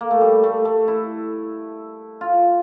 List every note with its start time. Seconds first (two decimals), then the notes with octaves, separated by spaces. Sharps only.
0.01 A#3
0.11 A3
0.21 G3
0.43 A3
0.65 A3
0.88 E4
2.21 F4